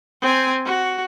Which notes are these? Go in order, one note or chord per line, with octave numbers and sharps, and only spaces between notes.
C4 G#5
F#4